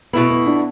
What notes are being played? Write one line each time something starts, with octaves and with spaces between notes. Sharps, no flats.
B2 A3 B3 E4
B3
D4